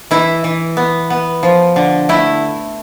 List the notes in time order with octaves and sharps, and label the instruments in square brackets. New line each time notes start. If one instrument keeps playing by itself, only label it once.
[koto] E3 E4
E3
B3
B3
F3
D3
A3 E4